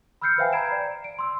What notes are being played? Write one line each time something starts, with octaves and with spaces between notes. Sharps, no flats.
B5 E6 F6 G6 C7 C#7
B4 C5 E5 F5 G5 G#5
A#5 B5 G#6 C7 D7 E7
D5
D7
C6 E6